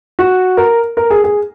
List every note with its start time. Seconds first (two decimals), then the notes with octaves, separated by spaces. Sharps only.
0.19 F#4
0.57 A#4
0.97 A#4
1.10 G#4
1.24 G#4